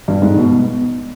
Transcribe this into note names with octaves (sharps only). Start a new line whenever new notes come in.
G2
G#2
B2